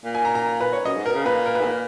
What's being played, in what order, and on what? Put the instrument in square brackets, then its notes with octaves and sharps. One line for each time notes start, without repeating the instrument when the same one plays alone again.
[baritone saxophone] A#2
[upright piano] G#5
A#5
A#5
B4
C#5
[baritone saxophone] F#2 [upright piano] D#5
[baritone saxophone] G#2
[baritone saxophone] B2 [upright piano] A#4
[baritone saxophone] C#3
[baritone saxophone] A#2 [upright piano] B4
[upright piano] A#4
B4
[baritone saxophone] G#2
A#2